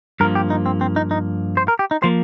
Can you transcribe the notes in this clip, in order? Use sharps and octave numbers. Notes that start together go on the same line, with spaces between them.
G2 F3 A#3 A#4
G4
D#4
C4
C4
D#4
D#4
C5
A#4
G4
D#4
F3 A#3 C5